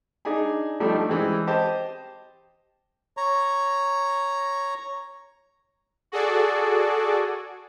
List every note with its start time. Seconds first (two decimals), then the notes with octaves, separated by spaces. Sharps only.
0.25 D4 D#4 G#4 G#5
0.80 F3 G3 A3 D4 D#4
1.09 E3 G#3 C4
1.47 G4 C5 D#5 A5
3.17 C#5 A#5
6.12 F#4 G#4 A4 D5